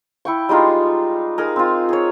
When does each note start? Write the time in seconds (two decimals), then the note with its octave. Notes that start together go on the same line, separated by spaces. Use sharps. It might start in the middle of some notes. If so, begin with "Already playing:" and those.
0.25 E4 G5 C#6
0.49 G3 G#3 D#4 F4
1.38 D#4 G#4 A#4
1.56 C4 F4
1.89 G#4 C#5